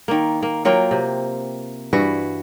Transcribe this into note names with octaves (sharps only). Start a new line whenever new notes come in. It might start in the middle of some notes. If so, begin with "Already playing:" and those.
D#3 A#3
A#3
F#3 A#3 F4 G5
C3
G2 E3 F#4 B4